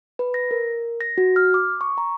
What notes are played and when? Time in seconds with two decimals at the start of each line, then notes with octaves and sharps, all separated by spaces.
0.19 B4
0.34 A#6
0.51 A#4
1.01 A#6
1.18 F#4
1.36 F6
1.54 D6
1.81 C#6
1.98 A#5